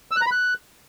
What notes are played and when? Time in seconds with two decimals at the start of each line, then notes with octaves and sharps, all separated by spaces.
0.11 E6
0.16 F#6
0.21 A#5
0.26 B5
0.31 F#6